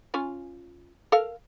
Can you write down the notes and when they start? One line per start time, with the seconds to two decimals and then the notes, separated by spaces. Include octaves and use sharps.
0.14 C#4 F4 G#5
1.12 A4 A#4 F5